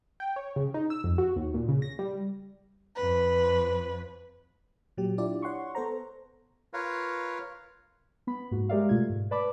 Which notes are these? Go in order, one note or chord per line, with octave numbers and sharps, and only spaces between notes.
G5
C#5
C#3
D#4
E6
F2
F#4
D#2
A#2
C#3
A#6
G3
F2 B4
A#2 F#3 G4
D4 E4 F4 G4 D5
C#5 F#5 C6 C#6
B3 A4 C5 A#5
F4 A#4 B4 C#5 F5
B3 B5
G#2 A#3 F#4
G#3 G4 A#4 D5 E5 F5
B2 A3 F4 G#6
G#2
B4 D5 A5 B5 D6